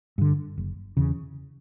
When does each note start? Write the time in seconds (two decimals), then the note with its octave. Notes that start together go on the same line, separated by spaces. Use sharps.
0.18 G2 D3
0.57 F#1
0.97 E2 C#3